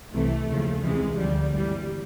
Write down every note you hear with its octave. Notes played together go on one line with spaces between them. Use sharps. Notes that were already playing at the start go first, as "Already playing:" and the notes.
C2 C3 E3 A3
D#2 C#3 F3
C2 C3 E3 G#3
D2 D3 F3 G3
G#1 G2 E3 G3